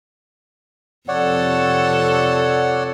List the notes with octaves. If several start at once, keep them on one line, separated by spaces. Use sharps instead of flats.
F2 C3 A4 C#5 D5 F#5